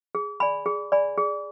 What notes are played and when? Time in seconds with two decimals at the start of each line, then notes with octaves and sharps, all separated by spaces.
0.15 G#4
0.40 D5 G#5 B5
0.66 G#4
0.92 D5 G#5 B5
1.17 G#4